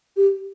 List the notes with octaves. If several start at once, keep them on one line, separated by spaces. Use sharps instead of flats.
G4